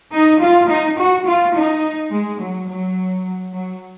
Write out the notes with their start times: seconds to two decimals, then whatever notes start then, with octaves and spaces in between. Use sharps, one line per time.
0.12 D#4
0.41 F4
0.69 D#4
0.98 F#4
1.26 F4
1.55 D#4
2.12 G#3
2.40 F#3
2.69 F#3
3.54 F#3